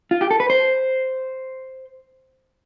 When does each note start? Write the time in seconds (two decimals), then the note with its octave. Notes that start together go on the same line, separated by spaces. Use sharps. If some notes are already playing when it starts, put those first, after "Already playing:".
0.11 F4
0.21 G4
0.31 A4
0.40 B4
0.50 C5